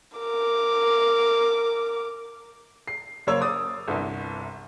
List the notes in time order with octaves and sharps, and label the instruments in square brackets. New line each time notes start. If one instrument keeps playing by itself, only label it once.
[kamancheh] A#4 D6
[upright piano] C7
F#2 C#3 A#3 C5 C#5 E6
D6 D#6 A6
G1 C2